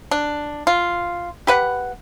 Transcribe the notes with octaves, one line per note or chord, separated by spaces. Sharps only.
D4
F4
G4 B4 F#5